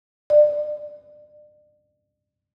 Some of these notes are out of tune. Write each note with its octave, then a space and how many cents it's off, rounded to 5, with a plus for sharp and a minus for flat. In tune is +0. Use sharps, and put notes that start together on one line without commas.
D5 +35